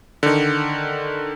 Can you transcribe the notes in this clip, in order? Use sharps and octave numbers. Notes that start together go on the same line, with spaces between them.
D3 D#3